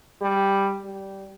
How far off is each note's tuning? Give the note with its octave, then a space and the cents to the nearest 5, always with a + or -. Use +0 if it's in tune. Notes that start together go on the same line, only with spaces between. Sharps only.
G3 +5
G3 -10